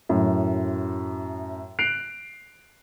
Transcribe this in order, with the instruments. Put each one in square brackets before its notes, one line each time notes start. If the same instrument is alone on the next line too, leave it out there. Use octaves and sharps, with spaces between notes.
[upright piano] F#2 A2
F#6 C7 D7 F7